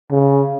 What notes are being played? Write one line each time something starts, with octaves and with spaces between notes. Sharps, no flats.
C#3